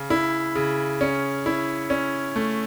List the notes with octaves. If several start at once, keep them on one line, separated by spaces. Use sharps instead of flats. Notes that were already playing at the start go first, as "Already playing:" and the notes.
Already playing: C#3
E4
C#3
C#4
E4
C#4
A3